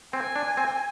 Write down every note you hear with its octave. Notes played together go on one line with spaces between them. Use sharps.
C4 G#5
D4
C4